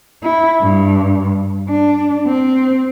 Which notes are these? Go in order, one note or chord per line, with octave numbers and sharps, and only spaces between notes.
E4
G2
D4
C4